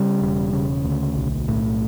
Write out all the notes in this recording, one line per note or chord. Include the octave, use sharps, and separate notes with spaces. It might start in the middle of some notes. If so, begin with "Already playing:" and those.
Already playing: C#3 G3
E1
C#3
D2
B1
A2